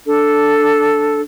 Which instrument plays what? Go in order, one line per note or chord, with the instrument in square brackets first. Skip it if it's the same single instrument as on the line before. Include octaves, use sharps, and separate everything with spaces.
[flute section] D4 A4